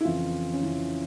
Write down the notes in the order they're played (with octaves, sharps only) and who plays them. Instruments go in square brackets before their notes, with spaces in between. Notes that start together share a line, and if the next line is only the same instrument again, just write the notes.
[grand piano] E4
F2 C#3 E3 F4
C#4
F2 C#3 E3 E4